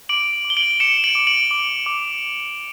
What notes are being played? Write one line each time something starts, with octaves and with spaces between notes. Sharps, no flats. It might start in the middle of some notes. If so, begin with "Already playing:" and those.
D6 D7 F#7
D6
G7
D7 F#7
F#7
D6 C#7 E7
D7 F#7
D6
D7 F#7
D6
D6